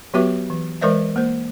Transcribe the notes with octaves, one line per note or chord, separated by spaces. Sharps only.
F#3 B3 F#4 G4 B4 E5
E3
E3 G#3 A#4 C5 D5 E5
A#3 C5